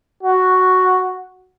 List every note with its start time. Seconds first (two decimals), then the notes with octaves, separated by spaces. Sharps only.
0.23 F#4